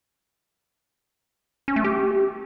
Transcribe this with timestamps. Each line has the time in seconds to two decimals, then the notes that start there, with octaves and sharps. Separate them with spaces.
1.68 C#4
1.76 A3
1.84 G4